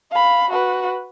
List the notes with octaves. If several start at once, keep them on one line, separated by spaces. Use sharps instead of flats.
F5 B5
F#4 B4